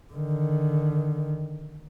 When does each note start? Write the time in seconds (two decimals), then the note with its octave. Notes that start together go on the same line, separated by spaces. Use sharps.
0.13 D3 D#3